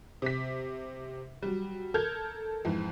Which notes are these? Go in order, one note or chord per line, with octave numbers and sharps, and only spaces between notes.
C3 B6
F#3 G3
A4 A#4 F6 G6 G#6
F2 G#2 E3